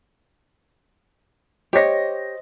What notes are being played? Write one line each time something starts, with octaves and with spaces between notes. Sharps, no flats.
G4 C5 C#5 D#5 A#6